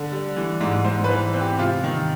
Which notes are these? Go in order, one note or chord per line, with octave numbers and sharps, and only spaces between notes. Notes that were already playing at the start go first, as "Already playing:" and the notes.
Already playing: D3
G3
E3
G#2
G#2 C5
B4
E3
C4
G4
C3 F4
D#3